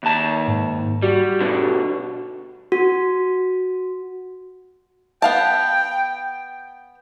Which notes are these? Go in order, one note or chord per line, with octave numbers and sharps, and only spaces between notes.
D#2 A5
G#2
G3 F#4
B2 D3
F#4
B3 F5 G5 A5